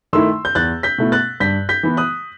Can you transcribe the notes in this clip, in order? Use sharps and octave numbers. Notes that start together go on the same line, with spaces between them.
D#3 A3 E4 C6 E6
G6
E2 F#6 A6
G6 B6
B2 A3 E4
F#6 A6
G2 G6 B6
G6 B6
E3 B3 E4
D#6 F#6